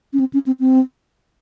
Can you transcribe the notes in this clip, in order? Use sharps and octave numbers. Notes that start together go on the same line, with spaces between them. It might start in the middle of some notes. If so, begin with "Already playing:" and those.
C#4
C4
C#4
C4
C4